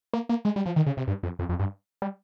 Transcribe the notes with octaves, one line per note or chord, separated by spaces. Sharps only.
A#3
A#3
G#3
G3
F3
D#3
C#3
C3
G2
F2
F2
F2
G2
G3